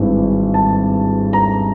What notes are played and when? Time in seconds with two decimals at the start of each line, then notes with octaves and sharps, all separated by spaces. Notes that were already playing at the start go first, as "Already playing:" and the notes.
Already playing: G#1 G2 E3 G#3
0.54 A5
1.33 A#5